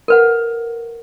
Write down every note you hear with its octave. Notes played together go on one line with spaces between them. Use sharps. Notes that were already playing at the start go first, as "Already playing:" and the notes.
A#4 B4 F#5